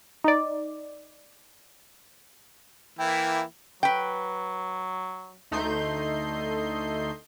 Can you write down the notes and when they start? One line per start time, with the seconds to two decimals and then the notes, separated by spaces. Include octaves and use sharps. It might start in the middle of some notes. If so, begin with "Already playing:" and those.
0.24 D#4 D5
2.99 E3 A#3 E4 G5
3.83 F#3 B4 G5
5.51 D2 A3 D#4 D#5 C6 G6